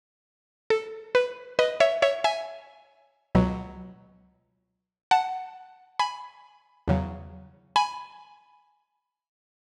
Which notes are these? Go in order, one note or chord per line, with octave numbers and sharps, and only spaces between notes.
A4
B4
B4 D#5
C#5 E5
C#5 E5
E5 G#5
C#2 B2 F#3
F#5 A5
G#5 B5
E2 C#3 F#3
G#5 B5